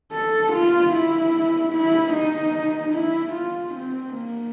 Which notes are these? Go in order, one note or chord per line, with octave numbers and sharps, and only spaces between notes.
A4
F4
E4
E4
D#4
E4
F4
C4
A#3